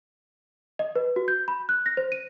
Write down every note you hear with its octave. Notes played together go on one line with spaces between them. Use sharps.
D#5
B4
F#4
G6
B5
F#6
A#6
C5
D#7